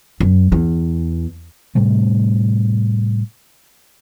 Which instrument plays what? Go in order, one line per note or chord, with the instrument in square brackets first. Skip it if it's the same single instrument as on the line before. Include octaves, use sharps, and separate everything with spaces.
[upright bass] F#2
E2
[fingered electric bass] A2 C3 G3 A3